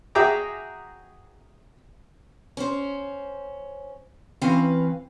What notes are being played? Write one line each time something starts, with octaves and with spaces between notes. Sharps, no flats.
F#4 G#4 E5 G5 A#5 D6
C#4 C5
E3 C4 C#4 B4 F5